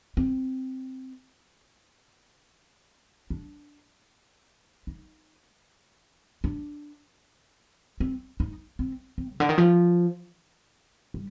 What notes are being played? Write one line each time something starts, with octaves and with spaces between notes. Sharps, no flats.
C4
D4
D#4
D4
C4
D#4
C4
C4
C3
D3
D#3
F3
G3